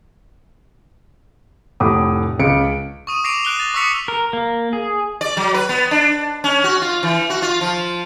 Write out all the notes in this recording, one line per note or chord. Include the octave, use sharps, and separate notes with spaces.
F1 A2 G4 F#5 D6 D#6
C#2 C#3 C#7 D7
C#6 D#6 D#7
D6 A#6 C7 D7 D#7 F7
F#6 D7 F7 G7
A6
C#6 D#6 E6 B6 C#7 F7
A#4
A#3
G#4
D5
F#3
B4
B3
D4
C#4
F#4
F4
E3
F#4
F4
F3